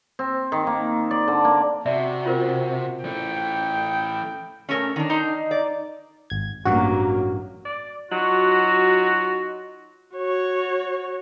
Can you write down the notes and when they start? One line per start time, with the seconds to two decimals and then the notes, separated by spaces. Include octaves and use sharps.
0.19 C4
0.52 D#3
0.67 A#3
1.11 D5
1.28 D3
1.45 A#3
1.86 C3 F#4 D5 E5
2.26 F4 A#4 C5
3.04 E3 A3 G5
4.69 A#2 A3 C#4 A#4 C#5
4.96 D#3 D4
5.10 D#4 A#5 C6
5.51 D5
6.30 G#1 G#6
6.65 A1 G2 F#3 A#3 F#4
7.65 D5
8.12 F#3 D#4 F4 F#4
10.16 F#4 C#5